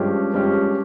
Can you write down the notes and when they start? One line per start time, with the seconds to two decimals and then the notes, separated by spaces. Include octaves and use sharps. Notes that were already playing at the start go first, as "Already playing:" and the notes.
Already playing: G2 F3 G#3 C#4 G4
0.33 G2 F3 G#3 C#4 G4